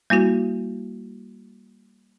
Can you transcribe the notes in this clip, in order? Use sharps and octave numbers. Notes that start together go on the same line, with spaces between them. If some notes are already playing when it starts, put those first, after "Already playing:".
G3 A#3 E4 F#4